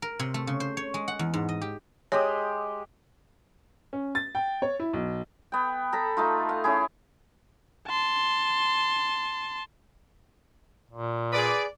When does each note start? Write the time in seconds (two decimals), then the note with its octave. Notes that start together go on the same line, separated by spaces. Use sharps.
0.02 A#4
0.19 C3
0.34 A3
0.47 C#3
0.60 C5
0.77 C#5
0.94 G#3
1.08 F#5
1.19 E2
1.34 G#2
1.49 D#5
1.62 G4
2.12 G#3 G4 C#5 D#6
3.93 C#4
4.15 A6
4.35 G5
4.62 C#5
4.80 E4
4.93 B1
5.52 B3 G5
5.93 A4 A#5 B5
6.17 A3 D#4 F4
6.49 F5 F#5
6.64 C#4 E4 G#4
7.88 A5 C6
10.91 A#2
11.33 G#4 B4 D5